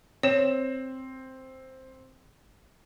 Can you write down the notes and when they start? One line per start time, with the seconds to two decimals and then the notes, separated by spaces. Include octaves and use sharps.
0.23 C4 C#5 E7